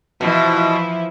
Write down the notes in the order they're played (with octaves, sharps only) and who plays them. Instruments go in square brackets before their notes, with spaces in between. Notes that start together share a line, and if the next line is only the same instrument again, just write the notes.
[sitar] B2 [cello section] E3 F3 E4